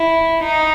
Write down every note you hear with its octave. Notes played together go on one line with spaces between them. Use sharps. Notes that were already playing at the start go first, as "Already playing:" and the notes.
Already playing: E4
D#4